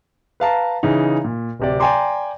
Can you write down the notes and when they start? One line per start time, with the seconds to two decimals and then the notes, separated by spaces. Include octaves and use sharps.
0.40 B4 F5 A5 A#5
0.83 C#3 E3 D#4
1.24 A#2
1.59 D1 C3 D5
1.80 D5 G5 G#5 A#5 C6 D6